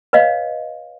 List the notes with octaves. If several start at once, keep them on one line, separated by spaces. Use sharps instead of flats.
B4 C#5 D#5 F5